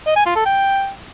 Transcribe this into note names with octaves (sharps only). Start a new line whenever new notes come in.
D#5
G#5
F4
A4
G5